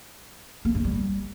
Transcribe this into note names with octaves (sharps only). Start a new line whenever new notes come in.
A#3
G2
G3